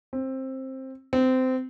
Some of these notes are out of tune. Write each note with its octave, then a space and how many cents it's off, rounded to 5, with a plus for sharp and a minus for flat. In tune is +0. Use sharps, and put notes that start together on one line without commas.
C4 +15
C4 -20